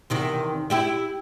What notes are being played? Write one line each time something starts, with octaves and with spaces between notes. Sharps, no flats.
E2 C3 D#3
E4 G4 E5